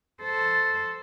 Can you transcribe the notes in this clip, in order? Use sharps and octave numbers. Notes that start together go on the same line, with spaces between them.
A4 C5